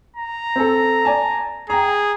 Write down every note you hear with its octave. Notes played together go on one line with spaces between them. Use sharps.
A#5
C4 A4
D5 G#5 A5
G#4 G5 A#5